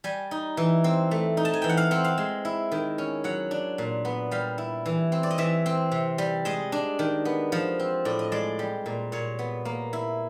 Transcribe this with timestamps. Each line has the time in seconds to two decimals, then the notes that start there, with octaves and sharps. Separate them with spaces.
0.04 G3 G#5
0.31 D#4
0.57 E3
0.84 C4
1.11 A3
1.37 D#4
1.45 A5
1.54 G#5
1.62 E3 G5
1.69 F#5
1.77 F5
1.91 C4 F#5
2.04 F5
2.18 G#3
2.45 E4
2.72 D#3
2.98 C#4
3.24 F#3 F#5
3.51 D4
3.78 A#2
4.05 B3
4.31 G3 F5
4.58 E4
4.86 E3
5.12 C4
5.23 D5
5.31 D#5
5.38 E3 E5
5.66 C4
5.92 C3
6.18 G3
6.45 G#3 D#5
6.72 D4
6.99 D#3
7.25 B3
7.52 F3
7.79 C4
8.05 A2 D5
8.19 D#5
8.32 G#3 D5
8.59 G3
8.86 A#2
9.12 A#2 C#5
9.39 B3
9.65 A#3
9.93 E4